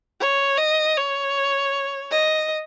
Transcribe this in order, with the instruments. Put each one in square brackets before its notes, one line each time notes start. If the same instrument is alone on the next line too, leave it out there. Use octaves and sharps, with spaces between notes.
[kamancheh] C#5
D#5
C#5
D#5